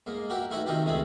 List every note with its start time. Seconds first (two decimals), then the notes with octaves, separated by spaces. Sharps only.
0.06 G#2 A#3
0.30 F#4 G4 A#4 E5
0.50 A3 D#4 E4 F#4 B4
0.66 C3 D#3 D#4 F4 G4
0.85 C#2 C3 G#3 A3 G#4 B5